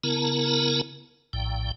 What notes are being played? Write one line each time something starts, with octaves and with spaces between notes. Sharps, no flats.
C#3 B3 E4 A#4 A5 A#5
A#1 A2 G5